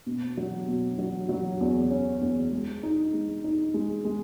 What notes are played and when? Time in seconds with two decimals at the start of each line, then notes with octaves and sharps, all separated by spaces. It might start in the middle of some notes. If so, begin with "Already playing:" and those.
0.06 B2
0.37 F#3
0.68 B2
0.99 F#3
1.29 F#3
1.60 E2
1.90 C#4
2.21 E2
2.52 G#3
2.83 D#4
3.13 G#3
3.44 D#4
3.74 G#3
4.05 G#3